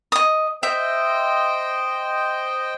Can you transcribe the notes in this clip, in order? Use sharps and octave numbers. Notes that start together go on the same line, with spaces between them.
D#5 D#6
C5 D#5 E5 G5